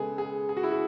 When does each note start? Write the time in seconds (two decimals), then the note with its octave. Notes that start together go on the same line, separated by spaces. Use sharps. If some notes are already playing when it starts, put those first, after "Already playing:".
Already playing: C#3 G#3 B3 G#4 A4
0.18 G#4
0.49 G#4
0.57 F#4
0.63 E4
0.71 F#4